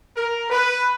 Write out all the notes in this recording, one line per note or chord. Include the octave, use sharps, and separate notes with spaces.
A#4
B4